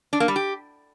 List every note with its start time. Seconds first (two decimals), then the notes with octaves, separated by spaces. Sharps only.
0.13 D4
0.20 A#3
0.28 G3
0.36 G4